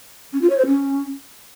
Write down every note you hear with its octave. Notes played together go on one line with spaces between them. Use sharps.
C#4
F4
C#5
C5
C#4